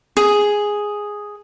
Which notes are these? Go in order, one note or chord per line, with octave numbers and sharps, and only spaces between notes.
G#4